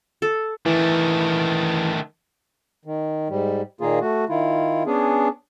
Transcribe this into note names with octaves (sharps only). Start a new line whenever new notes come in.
A4
D#3 E3 A3
D#3
G#2 G3
A#2 D#3 A#3 F4 G#4
A3 F#4
D#3 E4 F4
B3 C#4 D4 G#4